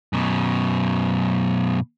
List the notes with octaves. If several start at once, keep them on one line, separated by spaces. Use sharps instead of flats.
F#2 B2